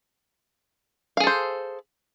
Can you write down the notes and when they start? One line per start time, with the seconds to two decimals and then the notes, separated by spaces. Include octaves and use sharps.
1.17 F5
1.20 G#4
1.24 A4
1.27 C5